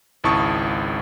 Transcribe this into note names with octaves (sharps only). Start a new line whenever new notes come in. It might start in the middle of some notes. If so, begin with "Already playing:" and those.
G#1 C#2 E4 A5 C#6 D#6